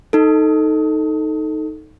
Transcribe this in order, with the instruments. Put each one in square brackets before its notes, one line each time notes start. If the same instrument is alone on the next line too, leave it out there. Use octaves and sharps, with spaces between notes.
[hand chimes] D#4 A4